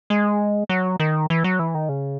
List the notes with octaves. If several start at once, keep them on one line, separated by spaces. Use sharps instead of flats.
G#3
F#3
D#3
E3
F#3
E3
D#3
C#3